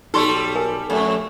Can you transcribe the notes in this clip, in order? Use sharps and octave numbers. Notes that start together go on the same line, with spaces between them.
B1 G3 D#4 A4 C6 C#6
A#4 G#5
F2 A3